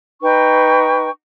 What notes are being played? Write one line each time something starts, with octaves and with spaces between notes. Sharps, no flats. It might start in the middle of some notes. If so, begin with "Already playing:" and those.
D#4 B4 G5 C#6